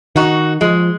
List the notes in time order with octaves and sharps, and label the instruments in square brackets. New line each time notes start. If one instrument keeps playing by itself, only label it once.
[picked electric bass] D#3 [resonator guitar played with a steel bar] D#4 F#4
[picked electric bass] F3 [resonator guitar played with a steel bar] G#3